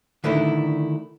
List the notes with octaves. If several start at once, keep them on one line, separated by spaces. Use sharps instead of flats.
D3 D#3 A3 D4 E4